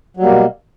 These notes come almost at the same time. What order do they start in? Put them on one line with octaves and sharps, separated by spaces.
F#3 G3 A#3 B2